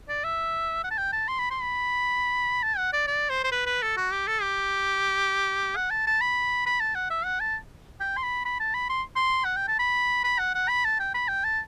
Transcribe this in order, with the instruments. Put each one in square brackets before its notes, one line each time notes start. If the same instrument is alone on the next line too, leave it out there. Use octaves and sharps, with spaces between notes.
[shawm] D5
E5
F#5
A5
G5
A5
C6
B5
C6
B5
A5
F#5
D5
D5
C5
C5
B4
B4
A4
F#4
G4
A4
G4
F#5
A5
A5
B5
B5
A5
F#5
E5
F#5
A5
G5
C6
B5
B5
A5
B5
C6
C6
F#5
G5
A5
B5
B5
F#5
F#5
B5
A5
G5
B5
G5
A5